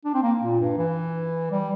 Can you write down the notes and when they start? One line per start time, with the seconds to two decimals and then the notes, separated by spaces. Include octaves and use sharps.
0.05 D4
0.14 C4
0.23 A#3
0.41 A#2
0.60 G2
0.78 E3
1.51 G3